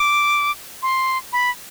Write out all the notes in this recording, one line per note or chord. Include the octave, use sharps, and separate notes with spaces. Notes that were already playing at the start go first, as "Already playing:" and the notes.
Already playing: D6
C6
B5